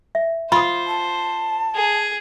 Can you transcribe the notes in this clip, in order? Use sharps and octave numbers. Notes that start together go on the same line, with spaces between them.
E5
F4 C5 B5 D#6
A5
G#4